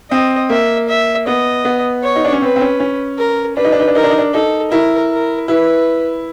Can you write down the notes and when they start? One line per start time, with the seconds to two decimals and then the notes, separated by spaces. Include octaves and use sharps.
0.11 C4 D#5
0.50 A#3 E5
0.89 E5
1.27 B3 D#5
1.65 B3
2.03 C#5
2.16 D#4
2.25 D4
2.33 C#4
2.42 C4 B4
2.56 C4
2.61 C#4
2.80 C#4
3.18 A#4
3.56 D4 B4
3.64 D#4
3.72 D4
3.80 D#4
3.88 D4
3.95 D#4 A#4
4.03 D4
4.10 D#4
4.18 D4
4.34 D#4 A4
4.72 E4 A#4
5.11 A#4
5.48 E4 B4